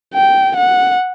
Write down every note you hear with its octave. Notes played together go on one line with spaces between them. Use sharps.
G5
F#5